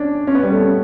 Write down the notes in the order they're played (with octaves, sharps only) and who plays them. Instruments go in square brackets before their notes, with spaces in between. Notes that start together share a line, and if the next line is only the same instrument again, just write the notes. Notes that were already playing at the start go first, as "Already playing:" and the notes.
Already playing: [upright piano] C#4 D4
C#4
B3
G3
A3
C#4